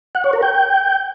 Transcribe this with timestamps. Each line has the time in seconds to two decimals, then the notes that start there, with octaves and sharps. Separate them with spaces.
0.15 F#5
0.24 C#5
0.33 A#4
0.42 G5